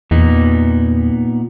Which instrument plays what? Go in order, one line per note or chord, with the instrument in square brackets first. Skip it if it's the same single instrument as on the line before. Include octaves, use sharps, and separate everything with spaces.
[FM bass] E2 [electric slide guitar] A#2 B3 D#4